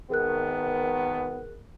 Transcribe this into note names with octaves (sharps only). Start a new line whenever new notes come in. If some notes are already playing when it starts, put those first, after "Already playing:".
G#1 D#3 B3 G#4 A#4 F#6